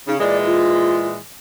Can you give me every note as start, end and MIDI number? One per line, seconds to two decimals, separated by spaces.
0.07 0.17 49
0.07 0.15 63
0.19 1.17 46
0.19 1.17 52
0.19 1.17 56
0.19 0.37 74
0.46 1.06 65